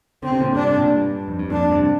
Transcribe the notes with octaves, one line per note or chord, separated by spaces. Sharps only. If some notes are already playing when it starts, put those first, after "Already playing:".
D3 C4
C3
A#2 D3
G2 C3 D4
A#2
G2
F2
G2
F2 A#2 D4
G2 C3